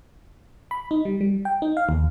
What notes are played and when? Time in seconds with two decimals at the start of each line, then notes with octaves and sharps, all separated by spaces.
0.71 B5
0.91 D#4
1.05 G3
1.21 G3
1.45 G5
1.62 D#4
1.77 F5
1.89 D#2